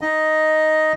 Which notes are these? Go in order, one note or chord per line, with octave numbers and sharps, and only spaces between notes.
D#4 D#5